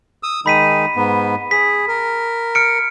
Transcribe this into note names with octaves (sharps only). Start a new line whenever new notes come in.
D#6 E6
D#3 G#3 D#4 B5 B6 D#7
G#2 B3
G#4 B6
A#4
F6 C#7 D7